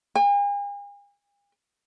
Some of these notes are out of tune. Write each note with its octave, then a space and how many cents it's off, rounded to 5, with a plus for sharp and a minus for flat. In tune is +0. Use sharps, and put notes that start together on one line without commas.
G#5 -45